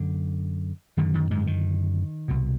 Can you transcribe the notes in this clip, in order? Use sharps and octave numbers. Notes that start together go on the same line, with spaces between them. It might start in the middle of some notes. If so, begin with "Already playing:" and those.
Already playing: F#2 D3
F#2 D3 D#3
D#3
G#2 G#3
D#3
C2 B2